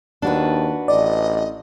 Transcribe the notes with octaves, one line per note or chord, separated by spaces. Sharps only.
D#2 D4 F#4 B4
A1 D5 D#5